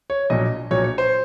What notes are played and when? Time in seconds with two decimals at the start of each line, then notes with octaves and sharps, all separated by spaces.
0.10 C#5
0.30 A#1 A#2 F#3 D#5
0.71 A#1 A#2 F#3 C#5
0.84 C#5
0.98 C5